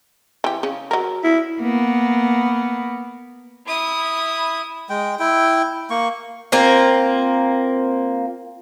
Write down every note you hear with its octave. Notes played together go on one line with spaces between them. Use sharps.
E3 G4
C#3 C#4
F#3 A#4
E4
A#3 B3
E4 D#6
G#3 G5
E4 G5
A#3 C#6
A#3 C4 F4